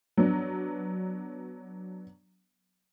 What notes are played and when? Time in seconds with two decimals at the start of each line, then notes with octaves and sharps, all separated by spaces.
0.17 F#3 B3 D4